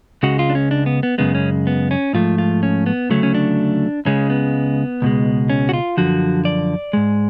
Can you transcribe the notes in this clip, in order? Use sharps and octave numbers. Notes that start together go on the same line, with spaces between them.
C#2 C#3 G#3 F#4
F4
D4
C#4
D4
B3
B3
F#2 C#3 G#3 B3
C#4
B3
C#4
G#2 F3 A3 F4
F4
C#4
B3
D2 C#3 F#3 A3 C#4
C#4
D4
C#2 C#3 G#3 C#4
B3
C#2 B2 G#3
C#4
F#4
F4
F#2 D3 F3 F#4
D5
G#2 G#3